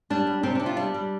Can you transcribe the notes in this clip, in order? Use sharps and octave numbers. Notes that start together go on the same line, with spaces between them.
G3 D4
G3
C3 C4
C3 D4
F4
G3 D4
G3